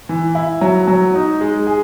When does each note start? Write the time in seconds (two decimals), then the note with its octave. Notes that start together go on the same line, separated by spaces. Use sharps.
0.09 E3
0.35 E4
0.61 F#3
0.87 F#3
1.15 D#4
1.41 G#3
1.67 G#4